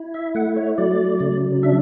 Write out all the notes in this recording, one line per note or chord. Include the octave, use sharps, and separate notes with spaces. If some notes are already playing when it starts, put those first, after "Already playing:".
Already playing: E4
E5
A3 F#5
C#5
F#3 D5
C#3
D4 E5